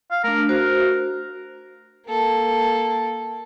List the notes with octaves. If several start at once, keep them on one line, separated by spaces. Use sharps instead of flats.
F5
A3 D4 A#4
F#4 A#4 C5
A#3 A4